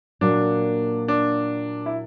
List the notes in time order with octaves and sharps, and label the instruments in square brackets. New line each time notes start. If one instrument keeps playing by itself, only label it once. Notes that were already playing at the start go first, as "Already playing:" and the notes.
[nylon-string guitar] A#2 F#3 A#3 [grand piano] D4
[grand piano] D4
E4